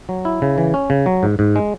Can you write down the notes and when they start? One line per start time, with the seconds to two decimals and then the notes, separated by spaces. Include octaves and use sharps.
0.09 F#3
0.25 E4
0.42 C#3
0.58 E3
0.74 C#4
0.90 C#3
1.06 F#3
1.23 G#2
1.39 G#2
1.56 G#3